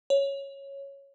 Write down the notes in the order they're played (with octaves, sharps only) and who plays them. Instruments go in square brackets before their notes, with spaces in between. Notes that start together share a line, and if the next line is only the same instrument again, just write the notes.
[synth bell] C#5